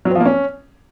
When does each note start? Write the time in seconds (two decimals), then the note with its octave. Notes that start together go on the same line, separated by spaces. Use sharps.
0.05 F#3
0.10 C4
0.15 F3
0.20 A#3
0.25 C#4